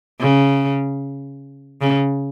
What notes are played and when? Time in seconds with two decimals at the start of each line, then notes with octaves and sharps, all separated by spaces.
0.21 C#3
1.82 C#3